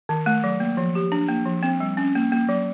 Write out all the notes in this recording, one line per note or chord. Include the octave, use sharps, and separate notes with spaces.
D#3
A3
F#3
A#3
F3
G4
D4
A#3
F3
C4
G3
C#4
A#3
A#3
F#3